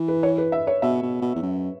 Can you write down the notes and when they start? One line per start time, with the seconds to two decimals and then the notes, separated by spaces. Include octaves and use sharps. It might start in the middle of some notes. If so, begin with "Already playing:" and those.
Already playing: E3
0.08 B4
0.23 C#5
0.38 B4
0.52 E5
0.67 C#5
0.82 B2 E5
1.02 B2
1.21 B2
1.35 E2
1.42 F#2